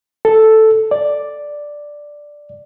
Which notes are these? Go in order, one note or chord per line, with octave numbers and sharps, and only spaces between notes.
A4
D5